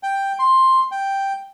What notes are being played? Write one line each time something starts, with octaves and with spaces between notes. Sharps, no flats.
G5
C6
G5